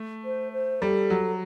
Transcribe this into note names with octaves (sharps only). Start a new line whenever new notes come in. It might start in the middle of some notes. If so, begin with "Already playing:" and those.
Already playing: A3
C5
C5
G3 A4
F#3